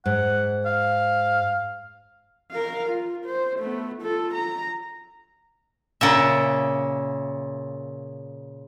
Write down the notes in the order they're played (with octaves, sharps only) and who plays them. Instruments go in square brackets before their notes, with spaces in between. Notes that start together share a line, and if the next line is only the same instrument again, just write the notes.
[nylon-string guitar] G#2 [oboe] F#5
[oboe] F5
[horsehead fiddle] A#4 F5
F4
C5
A3 B3
F4 A4
A#5
[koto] A#2 C#3 E5